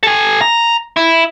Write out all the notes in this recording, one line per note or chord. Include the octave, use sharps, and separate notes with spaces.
A4 G#5
A#5
E4